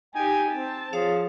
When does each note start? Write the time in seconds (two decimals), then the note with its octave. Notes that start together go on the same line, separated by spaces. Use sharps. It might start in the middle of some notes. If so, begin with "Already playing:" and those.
0.15 D#4 G4 G5 G#5
0.52 C4 A5
0.93 F3 G#4 C#5 F5